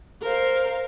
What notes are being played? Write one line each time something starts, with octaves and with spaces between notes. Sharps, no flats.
A#4 C5 F5